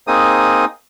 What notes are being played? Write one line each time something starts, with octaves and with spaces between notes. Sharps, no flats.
A#3 C4 D#4 G#4 D#6